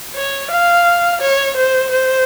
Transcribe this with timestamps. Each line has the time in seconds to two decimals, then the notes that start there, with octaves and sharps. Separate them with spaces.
0.15 C#5
0.50 F5
1.21 C#5
1.56 C5
1.92 C5